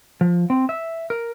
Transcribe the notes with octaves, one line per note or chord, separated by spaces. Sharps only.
F3
C4
E5
A#4